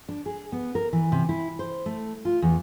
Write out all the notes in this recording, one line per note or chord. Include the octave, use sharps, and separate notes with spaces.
D4
G#4
B3
A#4
E3
C3
E4
C5
A3
F4
E2